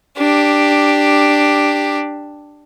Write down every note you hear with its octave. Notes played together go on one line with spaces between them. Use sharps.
D4 G4